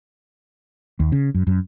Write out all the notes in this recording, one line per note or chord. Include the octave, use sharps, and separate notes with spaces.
D#2
C#3
F#2
F#2